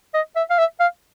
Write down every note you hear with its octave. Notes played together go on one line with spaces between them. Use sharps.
D#5
E5
F5
E5
F5